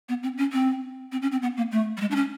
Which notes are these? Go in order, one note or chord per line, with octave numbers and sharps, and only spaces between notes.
B3
C4
C#4
C4
C4
C#4
C4
B3
A#3
A3
G3
G#3
D4
C#4